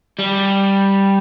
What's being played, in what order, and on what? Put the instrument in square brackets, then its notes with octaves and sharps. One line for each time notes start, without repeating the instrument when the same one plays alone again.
[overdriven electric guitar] G3